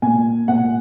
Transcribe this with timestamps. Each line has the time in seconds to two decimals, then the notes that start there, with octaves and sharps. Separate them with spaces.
0.02 A#2 G#5
0.48 A#2 F#5